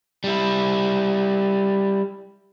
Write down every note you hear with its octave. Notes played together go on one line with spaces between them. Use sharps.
G3 E4